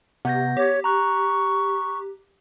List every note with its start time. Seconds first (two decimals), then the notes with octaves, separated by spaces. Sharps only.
0.25 C3 B3 G6 A#6
0.57 G4 C#5
0.84 A#5 C#6 F#6